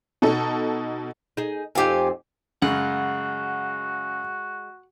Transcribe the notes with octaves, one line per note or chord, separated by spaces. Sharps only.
B2 D#4 A4
D#4 G#4
F2 C4 D#4 G4 F5 G#5
F#2 C#3 G#3 F#4 F#5